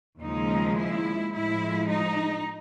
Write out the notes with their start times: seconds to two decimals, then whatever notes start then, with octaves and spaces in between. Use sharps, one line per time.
0.21 D#2 C#3 F3 G#3 D#4
0.77 E4
1.33 A2 F3 G#3 E4
1.89 D#4